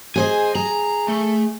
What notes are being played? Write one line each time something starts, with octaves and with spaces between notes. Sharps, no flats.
G#4 C5 D#5 G#5
G#4 A#5
A3